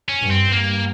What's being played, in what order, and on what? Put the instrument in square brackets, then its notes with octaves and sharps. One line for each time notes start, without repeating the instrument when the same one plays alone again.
[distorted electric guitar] C#4
[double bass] G2
[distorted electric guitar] C4
[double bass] G2 [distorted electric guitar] A#3